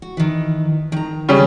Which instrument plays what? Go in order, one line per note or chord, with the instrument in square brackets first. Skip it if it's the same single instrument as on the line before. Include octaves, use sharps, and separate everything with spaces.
[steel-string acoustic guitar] F#4
D#3 E3
D#3 A#5
[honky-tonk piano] C#3 G3 C#4